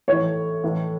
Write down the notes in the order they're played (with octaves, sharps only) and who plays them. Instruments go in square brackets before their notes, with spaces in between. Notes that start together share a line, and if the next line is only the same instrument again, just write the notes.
[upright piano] A2 E3 C#5
A2 E3